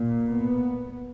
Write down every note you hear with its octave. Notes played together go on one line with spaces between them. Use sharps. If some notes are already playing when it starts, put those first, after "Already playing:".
Already playing: A#2
B3